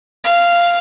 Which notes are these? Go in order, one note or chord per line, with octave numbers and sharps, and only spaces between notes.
F5